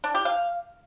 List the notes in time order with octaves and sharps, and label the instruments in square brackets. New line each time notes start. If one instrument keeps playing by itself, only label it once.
[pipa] D4
G4
F5